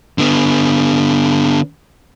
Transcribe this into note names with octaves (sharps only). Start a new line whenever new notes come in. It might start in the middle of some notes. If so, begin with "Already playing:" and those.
D3 B3